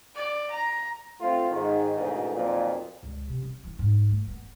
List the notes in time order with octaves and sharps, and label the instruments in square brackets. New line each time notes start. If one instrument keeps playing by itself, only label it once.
[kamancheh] D5
A#5
[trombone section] A3 C4 F4
G#2 D#3
A1 D2 G#2 B2
B1 F2 A#2
[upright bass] C#2
C3
C#4
E3
G#2
A3
B3